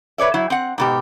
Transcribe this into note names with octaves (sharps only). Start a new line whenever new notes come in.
B4 C#5 D5 E5
F#3 E4
C4 F#5
G#2 B2 G4